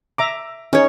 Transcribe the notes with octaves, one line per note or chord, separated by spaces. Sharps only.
E5 A#5 D6
C#4 D#4 G#4 C#5